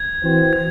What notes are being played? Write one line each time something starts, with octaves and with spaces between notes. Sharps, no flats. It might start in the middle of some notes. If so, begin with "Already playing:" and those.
Already playing: G#6
E3 C4 F#4 C5
G#6